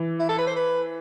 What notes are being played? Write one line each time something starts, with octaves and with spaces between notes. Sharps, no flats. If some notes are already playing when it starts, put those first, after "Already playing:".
Already playing: E3
E4
A4
B4
C5
B4